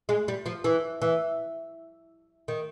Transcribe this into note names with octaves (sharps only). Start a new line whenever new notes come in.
G#3
G3
F3
E3
E3
D#3